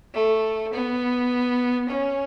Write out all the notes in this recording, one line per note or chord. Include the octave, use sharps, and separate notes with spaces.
A3
B3
C#4